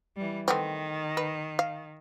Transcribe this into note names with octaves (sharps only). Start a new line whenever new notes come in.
E3 G3
D#3 A3 B3 C4
B4
F5